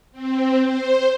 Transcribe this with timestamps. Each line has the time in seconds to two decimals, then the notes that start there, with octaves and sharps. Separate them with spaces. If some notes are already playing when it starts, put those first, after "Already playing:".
0.12 C4
0.61 C5